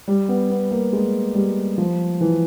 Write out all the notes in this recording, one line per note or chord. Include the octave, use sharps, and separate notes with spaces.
G3
B3
B3
A#3
G#3
G3
F3
E3